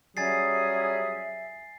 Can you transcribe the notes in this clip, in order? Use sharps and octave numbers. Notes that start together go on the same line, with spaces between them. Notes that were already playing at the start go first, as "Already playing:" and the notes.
F#3 G3 C#4 G#4 E5 G#5 A6 C7